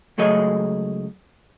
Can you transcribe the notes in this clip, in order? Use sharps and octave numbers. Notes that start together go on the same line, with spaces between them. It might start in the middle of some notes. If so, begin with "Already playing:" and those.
C#2 F#3 A3 G#4 D#5